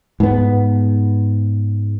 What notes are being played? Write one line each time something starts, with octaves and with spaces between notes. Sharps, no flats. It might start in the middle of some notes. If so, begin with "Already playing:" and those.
G#2 B3